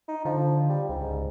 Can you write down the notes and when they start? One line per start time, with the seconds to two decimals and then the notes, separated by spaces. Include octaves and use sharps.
0.08 D#4
0.25 D3 F3
0.69 G3
0.89 C#2 G#2